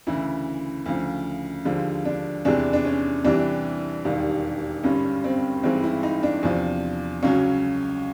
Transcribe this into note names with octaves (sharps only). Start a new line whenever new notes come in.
D2 C#3 E3 E4
D2 C#3 F3
D#2 D3 F3 G#3
D4
E2 C3 E3 G#3 D4
D4
C#4
C2 C3 E3 G3 D4
E1 D#2 D#3 G3
G#1 G2 D3 G3 C#4
C4
G#1 G2 E3 G#3 C4
E4
D#4
D4
E2 C3 F3
C#2 C#3 F#3 C#4